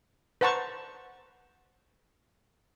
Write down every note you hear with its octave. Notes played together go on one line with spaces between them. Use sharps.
B4 C5 F#5 A5 A#5 C#6